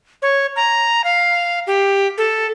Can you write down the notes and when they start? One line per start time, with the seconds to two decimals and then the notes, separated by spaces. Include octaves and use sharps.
0.22 C#5
0.56 A#5
1.04 F5
1.67 G4
2.18 A4